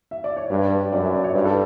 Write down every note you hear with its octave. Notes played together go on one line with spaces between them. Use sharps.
E5
D5
C#5
G2 B4
D5
F#2 D5
E5
D5
C#5
G2 B4
A4